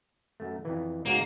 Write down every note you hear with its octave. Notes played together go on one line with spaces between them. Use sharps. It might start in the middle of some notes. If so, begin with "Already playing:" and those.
F#2 A3
F2 E3
C#2 G#2 A#3 F#4